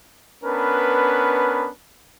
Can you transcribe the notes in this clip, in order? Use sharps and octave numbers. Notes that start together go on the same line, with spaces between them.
B3 C#4 D4 A#4 B4